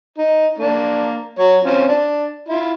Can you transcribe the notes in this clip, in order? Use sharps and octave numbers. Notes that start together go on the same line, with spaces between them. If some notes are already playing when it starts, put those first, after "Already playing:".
D#4
A#3 D4
F#3 C#5
C4 C#4 F4
D4
E4 F4